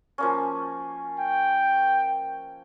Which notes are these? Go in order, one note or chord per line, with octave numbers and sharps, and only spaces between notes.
F3 A#3 C#4
G5